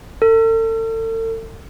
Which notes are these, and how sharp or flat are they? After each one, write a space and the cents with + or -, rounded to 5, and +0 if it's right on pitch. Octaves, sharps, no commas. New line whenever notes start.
A4 +40